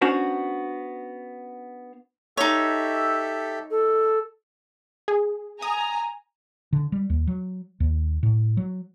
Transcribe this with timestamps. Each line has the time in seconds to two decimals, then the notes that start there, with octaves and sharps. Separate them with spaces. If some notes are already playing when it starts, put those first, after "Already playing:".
0.01 B3 C#4 D4 F#4 C5 C#5
2.37 D#4 G4 A4 C#5 E5
3.71 A4
5.08 G#4
5.62 G#5 A#5 D#6
6.73 D3
6.92 G3
7.10 D#2
7.27 F#3
7.80 D#2
8.23 A2
8.57 F#3